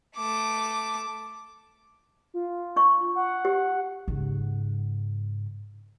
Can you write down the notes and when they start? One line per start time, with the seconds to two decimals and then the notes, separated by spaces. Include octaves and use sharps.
0.16 A3 D6
2.34 F4
2.76 D4 C#6
3.15 F#5
3.45 G4
4.08 G#2 C#3